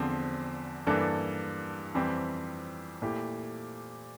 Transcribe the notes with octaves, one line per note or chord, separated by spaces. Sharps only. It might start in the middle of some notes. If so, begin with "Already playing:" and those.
Already playing: E2 D3 F3 C4
G2 E3 A#3 D4 A4
F2 E3 G3 C4 G4
A#2 A3 E4 G4